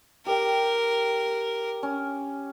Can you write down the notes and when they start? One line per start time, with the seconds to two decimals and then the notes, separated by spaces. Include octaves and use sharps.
0.26 G4 A#4 G5
1.83 C#4